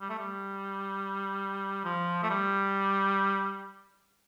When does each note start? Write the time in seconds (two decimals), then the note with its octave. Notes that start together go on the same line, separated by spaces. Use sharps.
0.01 G3
0.10 A3
0.19 G3
1.84 F3
2.23 A3
2.30 G3